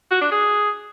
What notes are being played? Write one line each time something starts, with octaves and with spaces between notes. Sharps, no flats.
F#4
D4
G#4